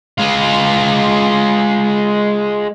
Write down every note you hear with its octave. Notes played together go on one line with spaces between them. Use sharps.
G#3 F4